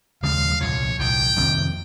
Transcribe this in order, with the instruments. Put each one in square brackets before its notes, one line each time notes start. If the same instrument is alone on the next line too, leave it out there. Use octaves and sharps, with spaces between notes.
[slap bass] D#2 C#3 F3 G#3 [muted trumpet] F5
[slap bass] C2 A#2 F3 [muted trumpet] C#5
[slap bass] C2 A#2 F3 [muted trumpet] G5
[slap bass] F2 C3 D#3 A#3